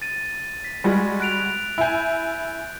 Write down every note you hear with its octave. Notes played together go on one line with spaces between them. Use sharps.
A6 D#7
B6
G3 G#3 F#4
F#6 D7 F7
E4 G#5 G6 D7